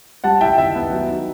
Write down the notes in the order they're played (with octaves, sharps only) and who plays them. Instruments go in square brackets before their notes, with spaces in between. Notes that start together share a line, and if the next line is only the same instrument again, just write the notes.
[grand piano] G3 F#5 A5
E4 E5 G5
D#3 E5
B3
F#3
D#4